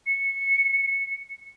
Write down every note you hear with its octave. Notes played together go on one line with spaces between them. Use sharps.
C#7